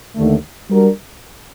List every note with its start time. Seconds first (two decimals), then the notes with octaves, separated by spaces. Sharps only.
0.15 D#2 D3 A3
0.69 G3 D4 F#4 A#4